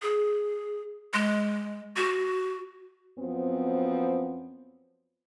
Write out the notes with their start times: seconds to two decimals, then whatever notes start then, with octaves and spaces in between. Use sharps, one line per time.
0.02 G#4
1.14 G#3
1.97 F#4
3.18 F#2 F3 B3 C4